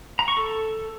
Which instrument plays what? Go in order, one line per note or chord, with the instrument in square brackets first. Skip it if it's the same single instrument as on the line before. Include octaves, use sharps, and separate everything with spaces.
[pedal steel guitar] A#5
C#6
A4